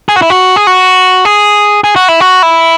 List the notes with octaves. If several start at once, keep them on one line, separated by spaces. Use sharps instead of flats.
G#4
F#4
E4
F#4
G#4
F#4
G#4
G#4
F#4
E4
F#4
E4